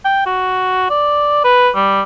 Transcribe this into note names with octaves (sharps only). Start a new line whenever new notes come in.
G5
F#4
D5
B4
G3